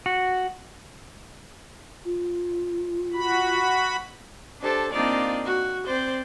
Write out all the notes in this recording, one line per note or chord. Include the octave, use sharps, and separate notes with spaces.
F#4
F4
F#4 B5
D4 G4 A4 C5
A#3 C4 D4 D#4 F4 D5
F#4
C4 C5 D5 G6